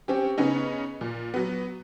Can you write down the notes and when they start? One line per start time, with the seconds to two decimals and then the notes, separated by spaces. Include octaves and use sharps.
0.08 C4 C#4 G4
0.38 C#3 B3 C#4 D#4
1.01 A#2
1.34 F#3 B3